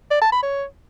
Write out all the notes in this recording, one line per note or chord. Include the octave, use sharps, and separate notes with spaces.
D5
A5
B5
C#5